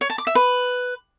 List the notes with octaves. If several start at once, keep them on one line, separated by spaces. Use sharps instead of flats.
C#5
A5
D6
E5
B4